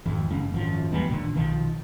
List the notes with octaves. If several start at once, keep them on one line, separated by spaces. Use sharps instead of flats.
G#1 F2
F#1
G#1 F#2 F3
E2 G3 G#3 B3
D#2 A#2 D3
B1 D#3 F3